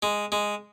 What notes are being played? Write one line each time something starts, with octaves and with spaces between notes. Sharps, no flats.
G#3
G#3